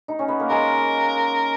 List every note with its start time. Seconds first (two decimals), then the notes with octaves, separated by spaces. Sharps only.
0.08 D#4
0.19 C#4
0.28 B3
0.40 A#3
0.49 G#3 A#4